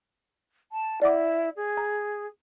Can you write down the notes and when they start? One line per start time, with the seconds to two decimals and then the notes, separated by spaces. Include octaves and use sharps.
0.72 A5
1.02 E4 D5 F#5 D6
1.56 G#4
1.77 A#5